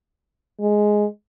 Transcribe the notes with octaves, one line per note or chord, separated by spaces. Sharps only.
G#3